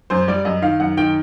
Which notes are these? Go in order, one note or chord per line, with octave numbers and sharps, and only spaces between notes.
F#2 C5
G3 D5
F#2 D#5
D#3 F5
F#2 F#5
D#3 G5